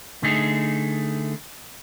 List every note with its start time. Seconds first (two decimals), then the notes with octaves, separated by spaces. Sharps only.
0.23 D3 A3 D#4 G#4